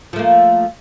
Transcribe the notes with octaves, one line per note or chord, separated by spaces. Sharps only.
F3 A3 A#3